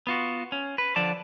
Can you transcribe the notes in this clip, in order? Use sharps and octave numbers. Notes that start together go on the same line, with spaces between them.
B3 F4 F#4
C#4
B4
D3 F3 D5 A5